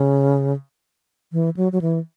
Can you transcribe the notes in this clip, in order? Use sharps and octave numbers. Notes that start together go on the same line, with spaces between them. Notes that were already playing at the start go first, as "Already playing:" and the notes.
Already playing: C#3
E3
F#3
F#3
E3